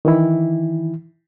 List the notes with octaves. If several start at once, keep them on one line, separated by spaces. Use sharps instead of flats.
D#3 E3 E4